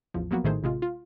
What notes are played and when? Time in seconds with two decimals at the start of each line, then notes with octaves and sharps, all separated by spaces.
0.14 A1 E2 F3
0.31 F3 F#3 A#3 B3 F#4
0.44 A#1 A2 D#3 A3 G#4 C5
0.63 A1 C3 G#3 F4
0.82 F4